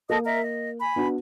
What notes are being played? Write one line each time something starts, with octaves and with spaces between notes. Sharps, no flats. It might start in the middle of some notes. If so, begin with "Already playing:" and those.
A#3 A4 D#5 D#6
A#4 D#5 E5
D#5
G#5 B5
B3 D4 F#4